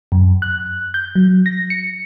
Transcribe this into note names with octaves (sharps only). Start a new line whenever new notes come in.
F#2
F#6
G6
F#3
A#6
C#7